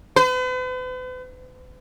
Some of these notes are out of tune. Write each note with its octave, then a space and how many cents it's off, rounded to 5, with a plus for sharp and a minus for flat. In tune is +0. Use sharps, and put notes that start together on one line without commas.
B4 +45